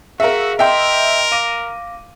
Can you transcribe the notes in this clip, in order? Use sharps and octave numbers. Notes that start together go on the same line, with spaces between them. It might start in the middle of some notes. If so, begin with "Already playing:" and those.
F#4 G#4 A#4 E5 F5
A#4 D#5 E5 G5 C6
F5 D6 A#6 D#7